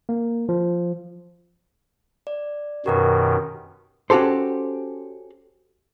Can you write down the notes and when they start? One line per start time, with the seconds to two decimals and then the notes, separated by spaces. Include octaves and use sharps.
0.09 A#3
0.49 F3
2.27 D5
2.86 F#2 B2 D#3 G4 A#4 B4
4.10 C#4 F#4 G4 A4 C5